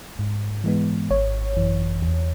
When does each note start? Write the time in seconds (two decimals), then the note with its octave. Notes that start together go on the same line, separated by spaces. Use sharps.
0.19 G#2
0.64 E3 G#3 B3
1.10 G#1 C#5
1.57 F#2 E3
2.02 E2